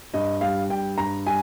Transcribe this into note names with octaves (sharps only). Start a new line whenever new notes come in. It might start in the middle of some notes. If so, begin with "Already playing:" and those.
G2 D#5
G3 F5
G2 G5
G2 A#5
G3 G#5